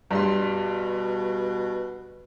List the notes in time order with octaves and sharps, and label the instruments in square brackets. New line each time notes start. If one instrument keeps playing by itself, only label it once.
[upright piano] G2 G3 C6 [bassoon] B2